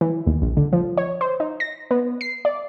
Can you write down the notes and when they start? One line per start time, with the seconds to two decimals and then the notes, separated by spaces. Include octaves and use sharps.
0.01 E3
0.27 D#2
0.42 A#1
0.57 D3
0.73 F3
0.97 C#5
1.21 C5
1.40 D#4
1.60 A#6
1.91 B3
2.21 C7
2.45 D5